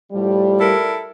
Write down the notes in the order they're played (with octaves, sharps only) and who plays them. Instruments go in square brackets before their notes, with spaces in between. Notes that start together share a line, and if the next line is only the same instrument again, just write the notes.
[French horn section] A2 F3 G3
[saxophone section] E4 A4 A#4